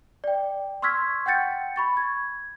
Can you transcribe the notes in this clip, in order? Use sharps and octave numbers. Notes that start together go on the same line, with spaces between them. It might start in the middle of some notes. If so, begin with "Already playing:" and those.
D5 G5
C6 C#6 E6 F6 G#6 B6
F#5 G5 G6 A6 C#7
B5 C#6 A6
G#6